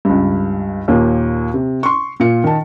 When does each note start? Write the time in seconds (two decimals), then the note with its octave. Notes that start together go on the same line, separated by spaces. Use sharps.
0.05 C#2 G2
0.88 D#2 A#2 A#3
1.54 C3
1.83 C6 C#6
2.20 A#2 F4 C#7
2.44 D#3 A5